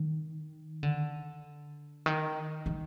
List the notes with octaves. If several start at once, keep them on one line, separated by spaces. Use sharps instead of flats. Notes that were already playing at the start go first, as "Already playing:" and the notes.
Already playing: D#3
D3
D#3
D#3